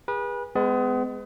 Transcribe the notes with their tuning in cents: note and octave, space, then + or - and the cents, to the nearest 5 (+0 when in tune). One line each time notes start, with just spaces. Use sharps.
G#4 -30 B4 -30
G#3 +0 B3 +35